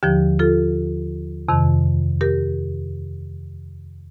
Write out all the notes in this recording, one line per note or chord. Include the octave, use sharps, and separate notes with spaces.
D#2 D3 F3 G4
F4 A4
F2 C3 D#3
G4 A#4